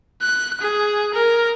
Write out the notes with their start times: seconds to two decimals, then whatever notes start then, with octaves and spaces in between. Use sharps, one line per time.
0.22 F#6
0.61 G#4
1.14 A#4